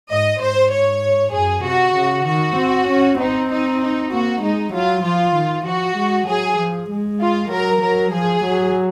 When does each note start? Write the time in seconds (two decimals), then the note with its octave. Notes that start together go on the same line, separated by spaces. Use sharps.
0.11 G#2 D#5
0.41 G#2 C5
0.72 C#5
1.34 F#2 G#4
1.65 C3 F#4
1.96 C#3
2.27 D#3 F#4
2.57 C4
2.89 C#4
3.19 C4 D#4
3.49 D#4
3.81 D#4
4.11 A#3 F#4
4.42 G#3 D#4
4.73 F#3 F4
5.04 F3 F4
5.35 D#3
5.66 F3 F#4
5.97 G#3
6.28 F#3 G#4
6.58 F3
6.90 G#3
7.21 F4
7.51 F#3 A#4
7.82 F#3 A#4
8.13 F3 G#4
8.44 F#3